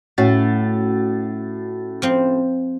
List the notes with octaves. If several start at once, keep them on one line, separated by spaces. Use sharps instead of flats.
A2 C#4 F#4 A6
F3 C4